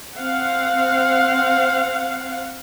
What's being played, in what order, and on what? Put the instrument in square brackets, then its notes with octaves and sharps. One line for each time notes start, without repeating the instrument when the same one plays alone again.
[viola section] C4 F5 F#5